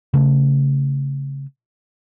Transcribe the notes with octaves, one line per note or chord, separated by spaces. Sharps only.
C#3 A3